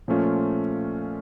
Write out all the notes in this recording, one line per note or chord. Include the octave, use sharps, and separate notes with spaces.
A#2 F3 A3 C#4 F4